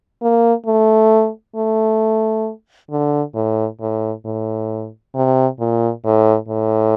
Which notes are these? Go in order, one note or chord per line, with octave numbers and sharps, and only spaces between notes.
A#3
A3
A3
D3
A2
A2
A2
C3
A#2
A2
A2